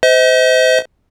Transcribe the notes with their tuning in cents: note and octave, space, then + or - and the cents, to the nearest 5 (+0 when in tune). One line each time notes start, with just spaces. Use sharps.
C5 -30 D#5 +40